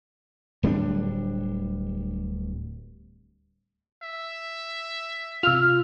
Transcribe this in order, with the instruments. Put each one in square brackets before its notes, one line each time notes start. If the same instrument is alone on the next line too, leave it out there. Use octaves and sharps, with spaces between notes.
[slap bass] D1 G3 A#3 D4
[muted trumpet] E5
[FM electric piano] C3 F4 [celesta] E6 F7 [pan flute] F6